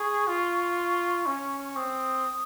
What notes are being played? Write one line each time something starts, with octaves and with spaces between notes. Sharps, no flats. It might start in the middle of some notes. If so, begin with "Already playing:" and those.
Already playing: G#4 C#6
F4
C#4
C#6
C4 D#6